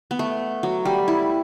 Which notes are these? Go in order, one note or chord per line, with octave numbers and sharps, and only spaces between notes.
B3
A3
F#3
G3
E4